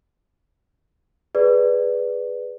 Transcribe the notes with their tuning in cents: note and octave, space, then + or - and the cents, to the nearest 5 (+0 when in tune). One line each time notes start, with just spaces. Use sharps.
G#4 +0 B4 +0 D5 +0